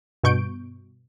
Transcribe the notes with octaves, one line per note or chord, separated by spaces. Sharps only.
G2 B2 C#6 G6 D7